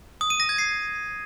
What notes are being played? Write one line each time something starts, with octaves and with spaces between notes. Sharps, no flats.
D#6
D#7
A#6
G#6
C7